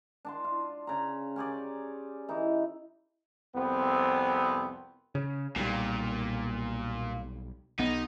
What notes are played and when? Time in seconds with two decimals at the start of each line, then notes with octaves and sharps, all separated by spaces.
0.25 D4 A5 C6
0.44 F4
0.87 C#3 A#5
1.36 C#4 G4 G#4 D5
2.29 E3 D#4
3.54 C2 F2 B3 C4
5.15 C#3
5.56 B1 A#2 G3
7.79 B1 B3 D#4